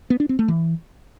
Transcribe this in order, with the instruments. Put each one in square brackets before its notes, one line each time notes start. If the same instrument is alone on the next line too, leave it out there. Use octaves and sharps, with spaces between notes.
[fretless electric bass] B3
D4
C4
A3
E3